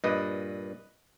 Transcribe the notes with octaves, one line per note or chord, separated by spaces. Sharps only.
G2 A#2 B4 D#5